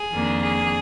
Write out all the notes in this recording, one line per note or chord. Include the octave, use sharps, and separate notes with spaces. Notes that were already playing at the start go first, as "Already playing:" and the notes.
Already playing: G#4
F2 D#3 A#3 D4
G#4